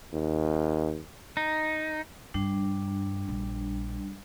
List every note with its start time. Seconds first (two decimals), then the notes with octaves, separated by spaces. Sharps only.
0.13 D#2
1.37 D#4
2.34 G2 G3 D4
3.28 A#1